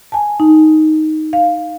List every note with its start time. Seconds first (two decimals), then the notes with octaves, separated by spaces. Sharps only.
0.12 G#5 A5
0.40 D#4
1.33 F5